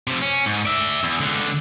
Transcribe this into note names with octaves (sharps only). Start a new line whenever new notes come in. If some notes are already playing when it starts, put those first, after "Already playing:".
C3 F3
C#4
G#2
D5 E5
E2
C#2 D3